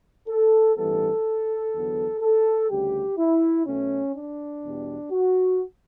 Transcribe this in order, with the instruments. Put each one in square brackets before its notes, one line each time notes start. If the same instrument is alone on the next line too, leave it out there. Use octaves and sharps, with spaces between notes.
[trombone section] A4
A1 G2 E3 G3 B3 A4
E2 D3 F#3 B3
A4
D2 C#3 G3 G4
E4
B1 B2 A3 C#4
D4
E2 B2 G3
F#4